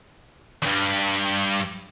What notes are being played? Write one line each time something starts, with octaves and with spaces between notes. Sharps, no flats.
E2 G2